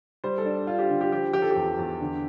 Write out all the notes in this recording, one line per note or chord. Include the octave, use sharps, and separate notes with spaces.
G3 C5
A4
D4
D4 F4
G4
D3
G4
F3 G4
F3 G4
A4
G4
E2
E2
D3